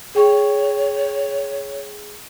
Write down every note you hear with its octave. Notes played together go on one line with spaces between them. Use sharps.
G#4 C#5 G5 C#6